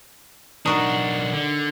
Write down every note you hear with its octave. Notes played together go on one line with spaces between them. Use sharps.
B1 D4 D#4 F#4 A#4
D3